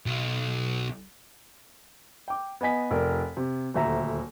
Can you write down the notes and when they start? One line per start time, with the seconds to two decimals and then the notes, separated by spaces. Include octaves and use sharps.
0.06 B1
2.28 G5 D6
2.61 B3 D#5 G#5 B6
2.91 F1 A#4 D5
3.37 C3
3.74 D#1 D2 E5 A#5